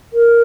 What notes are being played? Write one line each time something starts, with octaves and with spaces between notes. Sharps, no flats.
A#4